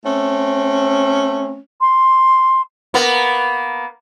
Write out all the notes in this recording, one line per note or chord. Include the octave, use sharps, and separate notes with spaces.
A3 C4 C#4
C6
A#3 B3